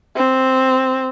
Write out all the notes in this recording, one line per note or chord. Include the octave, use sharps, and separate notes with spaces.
C4